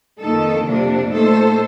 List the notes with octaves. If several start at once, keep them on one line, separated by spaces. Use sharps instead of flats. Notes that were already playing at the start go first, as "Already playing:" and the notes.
F2 D#3 A#3 D#4 A4
F2 C3 G3 A#3 D4
A#2 A3 D#4 A4 C5